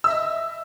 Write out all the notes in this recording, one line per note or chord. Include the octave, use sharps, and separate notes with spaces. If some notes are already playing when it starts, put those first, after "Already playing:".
D#5 E5 E6